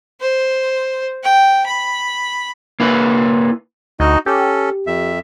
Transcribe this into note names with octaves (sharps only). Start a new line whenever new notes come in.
C5
G5
B5
A#3 E4 B4
D2 D#4 F#4 D#5
C#4 G4 A4
F2 E5